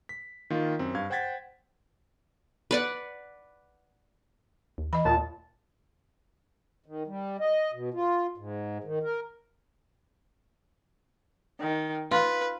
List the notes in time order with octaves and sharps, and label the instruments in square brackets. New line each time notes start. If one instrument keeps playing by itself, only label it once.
[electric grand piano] B6
D#3 A#3 F4
F#2 C4
G2 F5 G#6
C5 F#5 G5 G#6 A6 B6
[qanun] B4 D5 F#5
[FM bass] D#2
[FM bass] E3 [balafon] D#5 B5
[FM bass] D#2 [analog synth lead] A#2 [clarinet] A5
[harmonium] D#3
G3
D#5
B2
F4
G#2
D#3
A#4
[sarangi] D#3
[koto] F4 [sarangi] B4